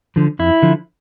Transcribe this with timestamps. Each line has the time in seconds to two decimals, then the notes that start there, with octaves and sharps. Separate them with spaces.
0.16 D3 F3
0.39 F2 E4
0.62 D3 F3